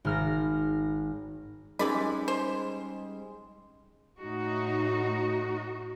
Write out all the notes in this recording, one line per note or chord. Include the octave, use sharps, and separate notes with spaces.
G#1 F6 A#6
E3 G3 G#3 C#4 D#4 D5 B5
C5
A2 D#4 F#4